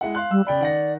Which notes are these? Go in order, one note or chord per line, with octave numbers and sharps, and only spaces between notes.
G#3 E4 F#5
F5 C6 F#6
G3 E6
C#3 D5 G5 B5
D#3 F#5 A#6